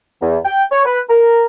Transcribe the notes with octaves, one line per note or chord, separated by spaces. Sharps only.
E2
G5
C#5
B4
A#4